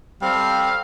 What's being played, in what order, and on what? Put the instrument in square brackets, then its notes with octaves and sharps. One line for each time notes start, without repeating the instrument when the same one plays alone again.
[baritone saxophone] G3 [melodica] C4 [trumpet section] A4 F5